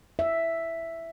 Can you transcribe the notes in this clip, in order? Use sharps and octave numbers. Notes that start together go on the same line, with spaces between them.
E5